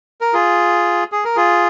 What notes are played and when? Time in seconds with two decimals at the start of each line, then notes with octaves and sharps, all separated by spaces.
0.21 A#4
0.33 F4 G#4
1.12 G#4
1.24 A#4
1.36 F4 G#4